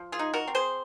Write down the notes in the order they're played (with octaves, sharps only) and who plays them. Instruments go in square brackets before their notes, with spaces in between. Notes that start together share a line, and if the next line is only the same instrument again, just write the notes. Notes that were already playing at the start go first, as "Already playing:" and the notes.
Already playing: [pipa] F3
F4 G#4
D#4
F#4 A#4
C4
G#4 C5